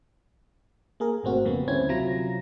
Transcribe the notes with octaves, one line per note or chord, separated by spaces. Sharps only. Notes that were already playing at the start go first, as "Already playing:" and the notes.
A#3 G#4 A#4
G#1 B2 A3 C4 F#4
F2 C#3 G3 A#3 B3
D2 C4 C#4 E4 C5 G#6
C3 F#3 E4 F4 A#5 A#6